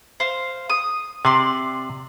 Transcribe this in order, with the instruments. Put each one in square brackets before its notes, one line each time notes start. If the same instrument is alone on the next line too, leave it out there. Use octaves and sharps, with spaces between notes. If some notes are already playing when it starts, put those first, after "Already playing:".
[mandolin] C5 F5
D#6
[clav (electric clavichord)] C3 [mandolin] D5 C6